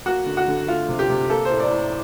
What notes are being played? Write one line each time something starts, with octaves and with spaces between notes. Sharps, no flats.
A#3 F#4
D3
F#4
D3
A3 F4
C3
G4
C3
A#3 A4
C5
A2
D5
A2